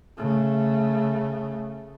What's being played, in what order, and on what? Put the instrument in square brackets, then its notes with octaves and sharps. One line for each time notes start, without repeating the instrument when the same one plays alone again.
[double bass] C#3 A3